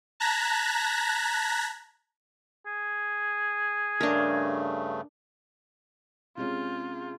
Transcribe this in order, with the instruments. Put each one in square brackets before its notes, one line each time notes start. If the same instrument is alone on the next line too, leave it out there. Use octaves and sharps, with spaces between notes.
[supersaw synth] A5 A#5 F#6 G#6 A#6 B6
[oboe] G#4
[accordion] G2 C#3 A3 [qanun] D4 A#4
[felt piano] C3 G#3 C#4 [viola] F4